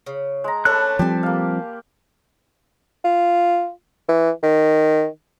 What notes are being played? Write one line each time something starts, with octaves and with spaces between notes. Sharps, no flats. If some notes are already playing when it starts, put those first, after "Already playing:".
C#3
G#3 A#5
A3 C#4 D4 A4 B4 F#6
F3 G3 C4 G4 G#5 A5
A#3 F5
F4
E3
D#3